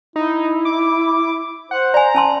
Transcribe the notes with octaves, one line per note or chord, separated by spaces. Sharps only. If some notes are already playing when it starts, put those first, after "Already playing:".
D#4 E4
D6
C5 F#5
D5 G#5 A#5
C#4 A5 C6